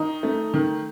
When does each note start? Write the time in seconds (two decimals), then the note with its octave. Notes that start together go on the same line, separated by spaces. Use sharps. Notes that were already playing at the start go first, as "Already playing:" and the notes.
Already playing: D#3 D#4
0.23 A3
0.54 D#3